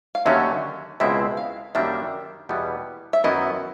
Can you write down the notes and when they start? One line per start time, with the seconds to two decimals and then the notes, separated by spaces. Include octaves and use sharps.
0.15 F5
0.26 D#2 D3 F#3 A3 C#4 E5
1.00 C#2 B2 G#3 C4 E4 E5
1.37 F5
1.75 F#2 D#3 G3 A#3 D4 E5
2.49 E2 B2 G3 B3 E4
3.13 E5
3.24 F#2 D#3 F#3 B3 E4 D#5